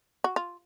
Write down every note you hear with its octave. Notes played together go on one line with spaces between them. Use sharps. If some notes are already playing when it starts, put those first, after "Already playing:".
F#4
F4